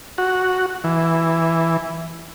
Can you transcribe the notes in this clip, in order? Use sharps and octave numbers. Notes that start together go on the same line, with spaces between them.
F#4
E3